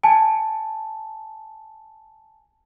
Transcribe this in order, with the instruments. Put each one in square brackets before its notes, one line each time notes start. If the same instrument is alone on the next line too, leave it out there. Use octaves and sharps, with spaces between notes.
[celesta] G#5 A5